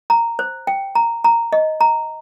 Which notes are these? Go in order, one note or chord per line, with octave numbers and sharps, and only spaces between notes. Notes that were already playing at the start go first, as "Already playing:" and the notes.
A#5
C5
G5
A#5
A#5
D#5
A#5